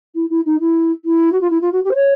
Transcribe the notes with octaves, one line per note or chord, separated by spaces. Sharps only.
E4
E4
D#4
E4
E4
F#4
F4
E4
F4
F#4
G4
C5
C#5